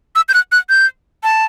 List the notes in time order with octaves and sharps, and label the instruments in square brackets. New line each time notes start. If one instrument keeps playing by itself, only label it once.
[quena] E6
G6
F#6
F#6
G6
A5